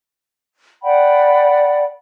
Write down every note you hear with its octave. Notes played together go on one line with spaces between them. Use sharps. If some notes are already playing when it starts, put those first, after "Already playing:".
D5 F#5 G5 B5